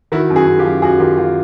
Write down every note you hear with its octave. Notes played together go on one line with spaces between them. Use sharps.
D#3 E4 F#4
F#2
F#4 G#4
F#2
F4 G4
F#2
F#2 F#4 G#4
D#3 F4 G4
D#3 F4